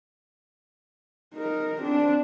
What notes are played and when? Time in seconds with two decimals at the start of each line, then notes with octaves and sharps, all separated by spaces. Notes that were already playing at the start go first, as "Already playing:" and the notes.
1.34 D#4 A#4
1.82 C4 D4